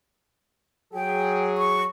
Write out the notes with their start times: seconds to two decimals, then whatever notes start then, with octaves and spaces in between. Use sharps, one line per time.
0.94 F#3 G#4 G5
1.58 C#6